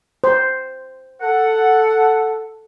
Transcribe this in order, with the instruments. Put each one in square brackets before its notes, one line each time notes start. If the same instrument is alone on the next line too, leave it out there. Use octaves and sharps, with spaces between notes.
[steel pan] C5
[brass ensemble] A4 [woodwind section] F#5